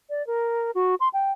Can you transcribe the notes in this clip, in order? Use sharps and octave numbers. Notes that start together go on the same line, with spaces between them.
D5
A#4
F#4
C6
G5